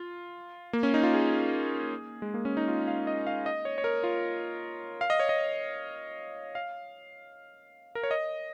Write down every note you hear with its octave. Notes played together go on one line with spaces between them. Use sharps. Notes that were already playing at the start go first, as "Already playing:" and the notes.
Already playing: F4
A#3
C#4
D#4
F4
G#4
G#3
A#3
C#4
D#4
F4
F5
D#5
F5
D#5
C#5
C#5
A#4
F4
F5
D#5
C#5
D#5
F5
A#4
C#5
D#5